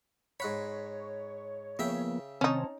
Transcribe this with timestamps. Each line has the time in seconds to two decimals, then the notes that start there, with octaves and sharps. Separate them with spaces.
0.40 G#2 C#5 F#5 B5
1.79 C#3 F3 A#3 B3 E5 G5
2.41 C3 D#3 C4 C#4 D#4 C#5 A5